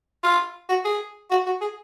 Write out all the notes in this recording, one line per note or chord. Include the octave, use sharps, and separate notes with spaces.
F4
F#4
G#4
F#4
F#4
G#4